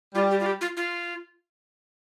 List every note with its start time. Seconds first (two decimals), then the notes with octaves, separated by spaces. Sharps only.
0.15 G3 F4
0.31 G4
0.40 F4
0.46 G4
0.61 F4
0.77 F4